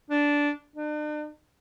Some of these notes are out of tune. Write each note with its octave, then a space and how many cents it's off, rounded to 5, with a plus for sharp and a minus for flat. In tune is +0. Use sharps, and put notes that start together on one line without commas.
D4 -10
D4 +45